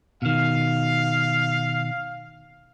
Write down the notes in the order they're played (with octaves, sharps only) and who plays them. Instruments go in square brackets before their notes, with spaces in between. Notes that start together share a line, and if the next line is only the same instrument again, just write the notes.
[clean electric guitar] B2 D#3 [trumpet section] F5